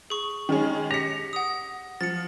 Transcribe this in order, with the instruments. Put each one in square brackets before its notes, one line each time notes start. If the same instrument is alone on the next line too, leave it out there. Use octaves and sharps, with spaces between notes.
[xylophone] G#4 C#6
[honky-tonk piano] D#3 G#3 C#4
[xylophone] G4 B6 [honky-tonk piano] A#6 C#7
[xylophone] F#5 D#6
[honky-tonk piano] F3 [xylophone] A6 C#7